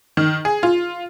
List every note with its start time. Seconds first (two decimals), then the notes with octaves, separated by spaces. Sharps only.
0.17 D#3
0.45 G#4
0.63 F4